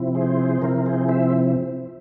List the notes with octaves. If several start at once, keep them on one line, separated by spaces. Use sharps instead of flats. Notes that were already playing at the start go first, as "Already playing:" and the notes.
Already playing: C3 F3 C4 E4
G#4 C5
C3 F3 C4 E4 A#4
G#4 C5
C5 E5